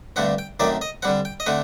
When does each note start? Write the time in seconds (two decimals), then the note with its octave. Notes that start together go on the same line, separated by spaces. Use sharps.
0.16 G2 D3 A3 C4 F#5
0.38 G5
0.60 F#2 D#3 A3 C4 D5
0.81 D#5
1.02 D3 G3 C4 F#5
1.25 G5
1.40 D#5
1.46 D3 A3 C4 F#5